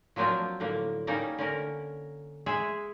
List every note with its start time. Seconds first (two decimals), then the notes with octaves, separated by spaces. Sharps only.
0.16 F3 F#3 A#3 C4 D4 F4
0.60 A2 D3 A#3
1.07 G3 A#3 C#4 D#4
1.38 D3 C#4 A#4
2.46 G#3 G#4 E5